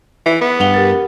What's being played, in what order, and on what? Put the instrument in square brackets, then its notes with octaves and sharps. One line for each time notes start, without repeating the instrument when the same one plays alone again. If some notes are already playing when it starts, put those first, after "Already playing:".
[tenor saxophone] E3
B3
[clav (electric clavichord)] G2 [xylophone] F#5 F7 G7
[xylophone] G4 A#4 A6